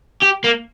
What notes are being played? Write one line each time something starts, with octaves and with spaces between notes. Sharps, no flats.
G4
A#3